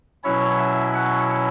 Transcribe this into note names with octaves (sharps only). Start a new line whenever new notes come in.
B2 F#3 C#4 E4 C#5
E5
F#5